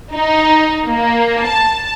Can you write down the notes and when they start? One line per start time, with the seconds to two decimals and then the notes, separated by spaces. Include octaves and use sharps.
0.14 D#4
0.87 A#3
1.46 A5